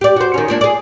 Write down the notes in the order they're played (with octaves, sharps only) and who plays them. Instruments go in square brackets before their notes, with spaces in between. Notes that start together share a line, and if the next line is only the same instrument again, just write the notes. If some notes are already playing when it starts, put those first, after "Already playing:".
[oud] G4 D5
F#4 C5
D#3 C#4
F3 A#3 D4
G#4 D5